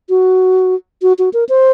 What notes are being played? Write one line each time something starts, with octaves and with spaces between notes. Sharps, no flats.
F#4
F#4
F#4
A#4
C5